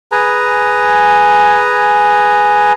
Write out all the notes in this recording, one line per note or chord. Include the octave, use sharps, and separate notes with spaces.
G#4 B4 G#5 A#5